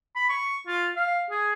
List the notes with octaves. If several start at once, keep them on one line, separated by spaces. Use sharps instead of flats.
B5
C#6
F4
F5
G#4